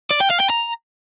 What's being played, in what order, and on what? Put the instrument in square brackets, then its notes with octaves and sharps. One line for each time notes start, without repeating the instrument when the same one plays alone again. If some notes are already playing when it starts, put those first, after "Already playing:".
[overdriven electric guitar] D5
G5
F5
G5
A#5